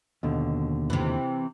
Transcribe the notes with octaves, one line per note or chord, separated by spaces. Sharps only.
D#2 B2 D3
C3 E3